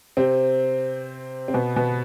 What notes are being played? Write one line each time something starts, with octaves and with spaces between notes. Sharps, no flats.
C3 C4
C4
B2 B3
B2 B3